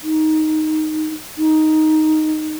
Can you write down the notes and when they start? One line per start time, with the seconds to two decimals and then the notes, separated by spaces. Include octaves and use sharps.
0.03 D#4
1.38 D#4